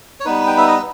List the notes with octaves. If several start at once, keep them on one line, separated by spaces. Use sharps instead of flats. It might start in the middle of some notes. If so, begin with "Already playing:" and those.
C#5
G3 B3 D#4 B4
G5
E5
D#5